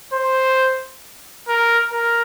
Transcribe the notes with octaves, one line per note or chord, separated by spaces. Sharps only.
C5
A#4
A#4